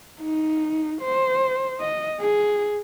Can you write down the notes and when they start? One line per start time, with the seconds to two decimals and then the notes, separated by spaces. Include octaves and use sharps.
0.21 D#4
1.02 C5
1.81 D#5
2.21 G#4